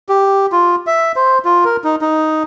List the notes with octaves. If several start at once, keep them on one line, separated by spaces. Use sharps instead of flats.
G4
F4
E5
C5
F4
A#4
D#4
D#4